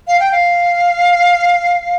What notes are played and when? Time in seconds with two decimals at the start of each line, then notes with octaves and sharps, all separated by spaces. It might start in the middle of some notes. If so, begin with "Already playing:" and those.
0.08 F5
0.20 G5
0.32 F5